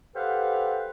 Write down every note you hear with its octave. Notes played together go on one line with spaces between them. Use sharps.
G4 A4 B4 C5 F5 F#5